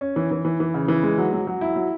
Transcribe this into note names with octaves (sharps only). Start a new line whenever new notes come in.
C#4
E3
E3
E3
E3
C#3
E3
G#3
F#3
F#3
F#3
E4
F#3